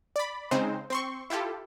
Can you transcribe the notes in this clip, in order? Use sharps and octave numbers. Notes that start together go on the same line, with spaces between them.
D5 B5
C#3 G#3 C4 D#4 C5
C4 C6 C#6
E4 F4 G4 A4